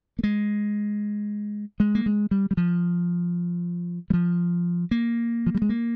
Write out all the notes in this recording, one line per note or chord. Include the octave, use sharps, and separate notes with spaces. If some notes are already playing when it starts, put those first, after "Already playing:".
A#3
G#3
G#3
A#3
G#3
G3
G3
F3
G3
F3
A#3
F3
G3
G#3
A#3